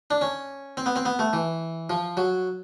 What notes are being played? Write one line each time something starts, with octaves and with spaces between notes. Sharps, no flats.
D4
C#4
C4
B3
C4
B3
A3
E3
F3
F#3